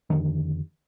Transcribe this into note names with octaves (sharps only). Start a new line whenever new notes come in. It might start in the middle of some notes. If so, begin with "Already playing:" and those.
F2 B2 D3 D#3